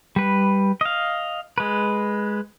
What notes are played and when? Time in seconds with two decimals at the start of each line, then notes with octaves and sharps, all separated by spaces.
0.16 G3 B4
0.81 D#5 F5
1.58 G#3 B4